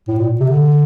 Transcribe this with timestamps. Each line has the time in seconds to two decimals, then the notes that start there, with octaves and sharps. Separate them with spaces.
0.08 A2
0.19 A#2
0.40 C3
0.50 D3